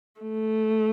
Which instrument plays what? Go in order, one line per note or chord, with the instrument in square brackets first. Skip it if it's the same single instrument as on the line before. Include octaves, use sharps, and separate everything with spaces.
[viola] A3